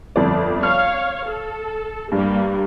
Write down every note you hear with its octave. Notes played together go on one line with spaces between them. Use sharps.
G1 F2 D5
C#5 F5 F6
A4
G2 G3 A#3